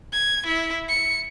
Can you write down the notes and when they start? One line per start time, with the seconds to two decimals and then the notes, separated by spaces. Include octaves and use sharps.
0.12 G#6
0.46 E4
0.88 C#7